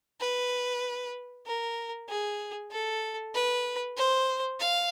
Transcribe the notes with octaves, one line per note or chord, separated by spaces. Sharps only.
B4
A#4
G#4
A4
B4
C5
F5